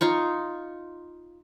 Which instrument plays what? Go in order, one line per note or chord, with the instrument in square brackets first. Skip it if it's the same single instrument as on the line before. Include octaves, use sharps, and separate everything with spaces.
[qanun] D#4 F4 C#6